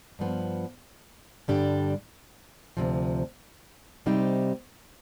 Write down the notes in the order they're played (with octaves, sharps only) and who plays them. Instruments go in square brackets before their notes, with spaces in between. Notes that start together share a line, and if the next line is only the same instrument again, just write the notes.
[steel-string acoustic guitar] G2 F3 B3
G2 D3 G3 D4 G4
D2 C3 F3
C3 G3 C4 D#4 G4